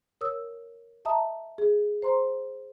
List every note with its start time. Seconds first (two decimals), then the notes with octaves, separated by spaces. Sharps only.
0.21 A#4 C#5 D#6 E6
1.05 D#5 E5 A5 A#5 D#6
1.58 G#4
2.02 C5 A#5 C6